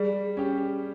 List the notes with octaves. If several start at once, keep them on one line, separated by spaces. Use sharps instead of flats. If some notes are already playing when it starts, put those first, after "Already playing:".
Already playing: G3 G#4
C#4 G4